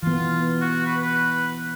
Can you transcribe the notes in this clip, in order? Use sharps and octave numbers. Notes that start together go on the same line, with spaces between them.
E3 B3 F4
F#4
B4
B4